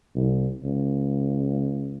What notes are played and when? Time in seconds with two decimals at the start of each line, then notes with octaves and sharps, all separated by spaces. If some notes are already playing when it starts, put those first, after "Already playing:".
0.15 C2
0.63 C#2